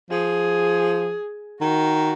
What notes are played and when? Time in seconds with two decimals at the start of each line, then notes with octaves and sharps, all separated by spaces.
0.10 F3 G#4
1.61 D#3 F#4